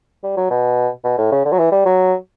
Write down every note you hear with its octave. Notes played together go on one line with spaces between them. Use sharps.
G3
F#3
B2
B2
A2
C#3
D3
F#3
E3
G3
F#3